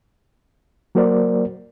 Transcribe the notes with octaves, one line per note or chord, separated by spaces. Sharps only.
F#3 A#3 F#4 A#4 C5 D5